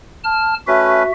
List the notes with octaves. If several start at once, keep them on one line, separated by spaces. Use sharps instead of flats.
A5 F6
A3 C#4 F#4 B4 E5